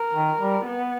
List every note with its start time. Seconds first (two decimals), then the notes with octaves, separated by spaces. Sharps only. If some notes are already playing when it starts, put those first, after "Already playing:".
Already playing: A#4
0.14 D#3
0.40 G3
0.66 B3